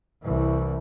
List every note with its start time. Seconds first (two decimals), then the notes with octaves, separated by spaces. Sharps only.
0.22 C2 E3